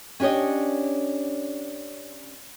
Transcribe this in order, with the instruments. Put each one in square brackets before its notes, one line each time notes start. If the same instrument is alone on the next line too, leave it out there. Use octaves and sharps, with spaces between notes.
[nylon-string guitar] C#4 D4 G4 C#5 D#5